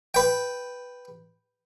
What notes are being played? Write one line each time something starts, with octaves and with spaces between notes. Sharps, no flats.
B4 G5